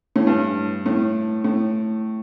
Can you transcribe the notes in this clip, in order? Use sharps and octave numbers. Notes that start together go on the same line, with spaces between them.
A2
G2
A2
A2